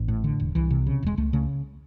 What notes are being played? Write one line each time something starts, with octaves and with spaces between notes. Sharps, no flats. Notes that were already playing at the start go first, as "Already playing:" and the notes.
Already playing: A1
A2
D3
E1
C2 E3
C3
C#3
E1 G#3
C#2 A3
C#3 A3